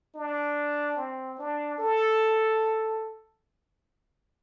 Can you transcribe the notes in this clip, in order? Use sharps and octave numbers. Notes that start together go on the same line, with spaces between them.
D4
C4
D4
A4